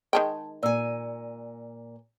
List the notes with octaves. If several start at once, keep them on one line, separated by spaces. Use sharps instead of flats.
D#3 G#3 D#5 G5 A5
A#2 D5 G#5 E6